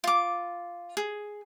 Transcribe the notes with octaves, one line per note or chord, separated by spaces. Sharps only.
F4 D6
G#4